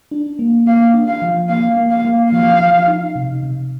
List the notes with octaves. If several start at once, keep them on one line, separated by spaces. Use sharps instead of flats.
D4
A#3
A#3 F5
D4
F5
F3
A#3 F5
A#3
F5
A#3
F3 F5
F3
D#4
C3
C3